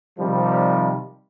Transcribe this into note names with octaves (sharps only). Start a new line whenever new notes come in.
C3 D#3 F3 G3